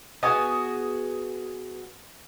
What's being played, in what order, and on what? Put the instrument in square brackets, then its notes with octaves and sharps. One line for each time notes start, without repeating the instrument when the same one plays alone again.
[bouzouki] B3 F#4 G#4 [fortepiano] D#5 G#5